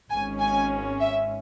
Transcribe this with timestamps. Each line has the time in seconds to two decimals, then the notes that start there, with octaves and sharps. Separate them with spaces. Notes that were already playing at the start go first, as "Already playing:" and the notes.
0.10 G#1 G#2 G#3 C#4 G#5
0.40 G#5
1.00 E5